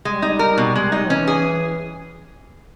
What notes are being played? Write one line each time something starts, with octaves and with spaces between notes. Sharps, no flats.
G3 G#3
D#4
A#4
B2
G#3
D#4
E3 C#4
G#4